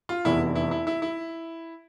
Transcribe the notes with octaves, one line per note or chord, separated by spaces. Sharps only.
F4
F1 E2 E3 E4
E4
E4
E4
E4